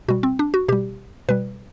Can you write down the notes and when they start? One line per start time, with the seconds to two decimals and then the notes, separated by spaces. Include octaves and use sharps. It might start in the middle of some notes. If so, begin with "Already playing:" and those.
0.08 B2 G3 F#4
0.23 C4
0.39 D4
0.54 F#4
0.68 B2 G3 G4
1.29 B2 G3 B4